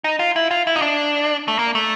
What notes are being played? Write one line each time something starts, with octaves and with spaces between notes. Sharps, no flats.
D#4
F4
E4
F4
E4
D#4
D4
A3
A#3
A3